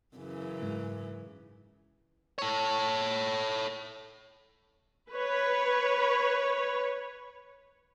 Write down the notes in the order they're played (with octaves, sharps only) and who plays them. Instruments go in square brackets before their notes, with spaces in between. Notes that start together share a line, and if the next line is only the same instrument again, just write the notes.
[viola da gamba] F#2 C#3 E3
[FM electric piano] G#2
[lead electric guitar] A4 C#5
[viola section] B4 C#5